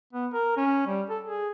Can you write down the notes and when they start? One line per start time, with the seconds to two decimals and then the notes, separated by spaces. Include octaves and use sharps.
0.13 B3
0.33 A#4
0.57 C#4
0.87 G3
1.10 A4
1.25 G#4